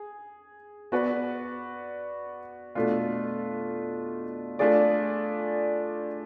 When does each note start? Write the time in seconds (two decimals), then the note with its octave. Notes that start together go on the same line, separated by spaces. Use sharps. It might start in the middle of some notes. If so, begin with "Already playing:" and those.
Already playing: G#4
0.92 B3 F#4 B4 D5
2.75 B2 A3 D4 F4
4.59 A3 D4 F4 G#4 D5